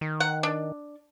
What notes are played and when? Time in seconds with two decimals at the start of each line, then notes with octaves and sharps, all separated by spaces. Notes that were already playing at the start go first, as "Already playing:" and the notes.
0.01 D#3
0.20 F#5
0.43 D4